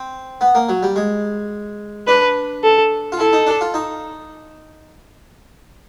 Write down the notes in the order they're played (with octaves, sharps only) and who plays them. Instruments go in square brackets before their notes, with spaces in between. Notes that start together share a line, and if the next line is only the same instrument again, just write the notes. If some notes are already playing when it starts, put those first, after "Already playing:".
Already playing: [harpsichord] C4
B3
A#3
F#3
G3
G#3
[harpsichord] D4 [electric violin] B4
[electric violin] A4
[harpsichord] F4
[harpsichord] E4 [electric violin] A4
[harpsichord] D#4
D4
F4
D#4